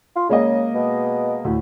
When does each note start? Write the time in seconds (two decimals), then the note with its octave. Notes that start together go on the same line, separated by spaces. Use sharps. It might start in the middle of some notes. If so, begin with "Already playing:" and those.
0.16 F4
0.29 C#3 G#3 A#3 D#5
0.75 B2
1.44 D2 A2